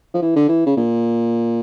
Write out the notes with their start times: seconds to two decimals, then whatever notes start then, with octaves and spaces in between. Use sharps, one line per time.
0.14 F3
0.22 E3
0.36 D3
0.49 E3
0.66 C#3
0.77 A#2